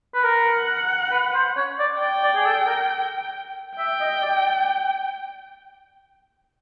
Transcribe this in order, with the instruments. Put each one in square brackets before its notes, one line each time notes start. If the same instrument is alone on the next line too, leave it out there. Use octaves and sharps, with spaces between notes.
[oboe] B4
[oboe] A#4 [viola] F#5
[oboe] B4
C5
C#5
D5
[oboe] D5 [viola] G5
[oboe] D5
G#4
A4
A#4
[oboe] E5 [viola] G5
[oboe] D#5
D5